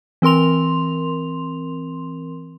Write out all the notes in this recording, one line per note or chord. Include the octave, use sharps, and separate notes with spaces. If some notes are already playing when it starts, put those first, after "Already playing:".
E3 C4 A#4 C6 F7